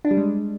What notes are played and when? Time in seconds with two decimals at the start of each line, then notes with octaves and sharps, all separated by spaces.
0.05 D4
0.11 G3
0.17 G#3